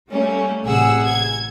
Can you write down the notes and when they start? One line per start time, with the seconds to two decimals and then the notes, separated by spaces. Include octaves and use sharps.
0.10 G3 A3 A#3 C#4
0.66 A1 C3 G#4 F#5 E6
1.04 G#6